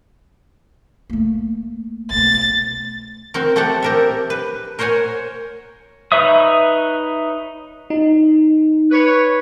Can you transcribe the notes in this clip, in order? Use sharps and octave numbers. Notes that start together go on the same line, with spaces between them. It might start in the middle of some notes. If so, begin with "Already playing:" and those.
A3 A#3
B1 A3 A6
C4 F#4 A#4
A3 C4 G4 A4 F#5
G4 A#4 E5
B4
A#4 C5 C#5 F#5 G#5
D#4 B4 C#5 E5 D#6
D#4
B4 C#5